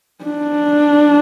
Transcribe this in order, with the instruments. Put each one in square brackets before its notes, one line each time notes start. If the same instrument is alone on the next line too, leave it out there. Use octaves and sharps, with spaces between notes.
[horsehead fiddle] D4